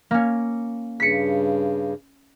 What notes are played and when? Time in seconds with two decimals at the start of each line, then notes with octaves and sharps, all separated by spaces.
0.11 A#3 C#4
1.00 G2 C#3 B6 C#7